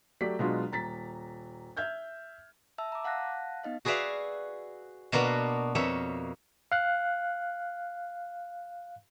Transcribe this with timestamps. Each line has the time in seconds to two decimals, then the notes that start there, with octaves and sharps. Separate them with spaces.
0.21 F#3 A3 G4 D5 B6
0.39 B2 F#3 G#3 D4 F4
0.72 D#1 A#5 A6 B6
1.77 E5 F6 G6 G#6
2.78 E5 A5 E6
2.92 A#5 D6
3.04 F5 F#5 A5 F#6 A#6
3.64 B3 D#4 D#5 F5
3.85 F#4 G#4 B4 D5 E5 F5
5.12 B2 A#3 B3 D4 F#4
5.75 F2 B2 A#3 C#5 E5
6.72 F5 F#6